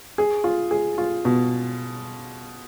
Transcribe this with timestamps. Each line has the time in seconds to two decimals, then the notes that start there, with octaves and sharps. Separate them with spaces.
0.18 G#4
0.44 F4
0.71 G#4
0.98 F4
1.25 B2